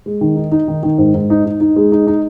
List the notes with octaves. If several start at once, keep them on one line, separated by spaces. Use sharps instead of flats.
G#3
D#3
D#4
D#4
D#3
D#3
G#2
G#2
D#4
D#4
D#4
G#3
D#4
D#4